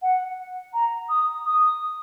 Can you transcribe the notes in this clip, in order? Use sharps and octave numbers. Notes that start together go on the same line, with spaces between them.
F#5
A#5
D#6
D#6